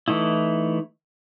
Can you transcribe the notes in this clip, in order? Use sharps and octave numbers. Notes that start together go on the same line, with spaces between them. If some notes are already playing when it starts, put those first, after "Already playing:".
E3 A3 D#4 E4